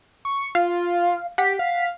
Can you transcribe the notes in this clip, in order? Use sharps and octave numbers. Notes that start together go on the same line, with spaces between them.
C#6
F4 F5
G4 F#5 B6
F5